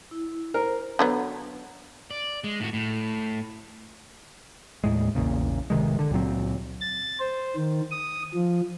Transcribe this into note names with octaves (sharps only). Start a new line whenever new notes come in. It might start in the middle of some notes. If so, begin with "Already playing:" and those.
E4
A#4 C5
D3 F#3 B3
D5
G#3
A2 F#4
A2
D#2 A2 G#3
A#1 E2 A#2 C#3
D1 C3 D#3 G#3
D3
C#2 A#2 F#3 C4
A6
C5
D#3
D#6
F3